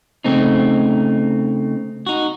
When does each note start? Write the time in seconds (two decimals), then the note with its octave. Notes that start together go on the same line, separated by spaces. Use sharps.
0.24 C#3 A3 C4 D#4
2.06 D#4 F#4